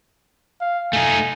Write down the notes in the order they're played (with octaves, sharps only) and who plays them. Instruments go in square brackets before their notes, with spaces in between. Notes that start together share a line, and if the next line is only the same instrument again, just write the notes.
[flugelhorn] F5
[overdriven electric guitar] A3 D#4 [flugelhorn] G#5